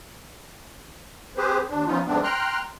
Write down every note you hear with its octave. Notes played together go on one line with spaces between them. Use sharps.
C4 G4 G#4 B4 C5
D#2 D4
F3 B3 C#4 D#4 F4
F2 G#2 C3 B3 C4 D4
G5 A#5 C6 F6 F#6